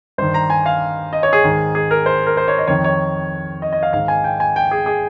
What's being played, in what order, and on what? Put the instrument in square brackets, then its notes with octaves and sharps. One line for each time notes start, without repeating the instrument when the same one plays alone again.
[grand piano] G2 D#3 C5
A#5
G#5
F5
D#5
C#5
G#4
G#2 D#3
G#4
A#4
C5
A#4
C5
C#5
D#5
F2 D#3 C#5
C#5
D#5
D#5
F5
G#2 D#3 F5
G#5
G5
G#5
G5
G#4
G#4